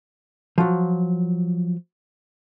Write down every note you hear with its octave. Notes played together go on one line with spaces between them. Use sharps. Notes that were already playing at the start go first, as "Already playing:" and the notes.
F3 F#3